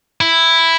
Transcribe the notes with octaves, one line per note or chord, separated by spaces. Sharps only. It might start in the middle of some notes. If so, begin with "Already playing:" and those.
E4